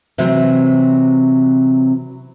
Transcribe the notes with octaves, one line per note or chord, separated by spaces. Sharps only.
C3 E3 F#3 C4